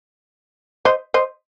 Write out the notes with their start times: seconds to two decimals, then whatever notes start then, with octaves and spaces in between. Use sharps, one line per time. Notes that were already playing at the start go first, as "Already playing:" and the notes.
0.85 C5 D#5
1.14 C5 D#5